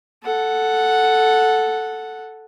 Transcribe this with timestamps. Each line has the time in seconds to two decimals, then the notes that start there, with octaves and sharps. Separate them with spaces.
0.23 A4 F#5